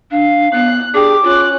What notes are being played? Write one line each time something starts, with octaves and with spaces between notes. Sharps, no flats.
D4 F5
B3 F#6
D4 G4 G#4 D6
C#4 F4 F#6